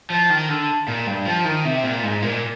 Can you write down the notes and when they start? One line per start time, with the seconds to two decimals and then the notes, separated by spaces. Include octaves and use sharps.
0.10 F3
0.30 D#3
0.49 D3
0.88 A#2
1.07 G2
1.26 F3
1.45 D#3
1.65 C3
1.83 A#2
2.03 G#2
2.22 A#2